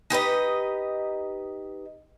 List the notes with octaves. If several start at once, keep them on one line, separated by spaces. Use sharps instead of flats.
D#4 G4 B4 D#5